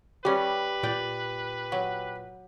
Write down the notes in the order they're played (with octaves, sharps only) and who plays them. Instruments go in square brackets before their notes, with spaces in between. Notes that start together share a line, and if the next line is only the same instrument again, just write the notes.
[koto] G3 C#4 [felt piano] G4 [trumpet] B4
[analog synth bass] A#2 [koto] D5 G5
[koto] F#3